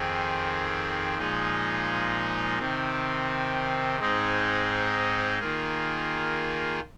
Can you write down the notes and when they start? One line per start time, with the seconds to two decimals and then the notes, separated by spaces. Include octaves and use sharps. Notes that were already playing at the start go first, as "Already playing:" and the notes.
Already playing: F2 D#3 C4 G#4
1.18 A#2 F3 G#3 D#4 G#4
2.59 C3 D#3 C4
3.99 G#2 G#3 C4 D#4 G#4
5.40 D#3 A#3 F4 G#4